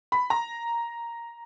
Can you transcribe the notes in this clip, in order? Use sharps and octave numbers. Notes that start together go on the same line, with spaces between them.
B5
A#5